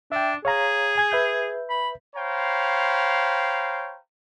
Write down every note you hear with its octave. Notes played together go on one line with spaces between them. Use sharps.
D4 E5 G5
G#4 C#5 F5 A#5
G#5 G#6
B4 E5 G6
B5
C5 C#5 F5 G5 A#5 B5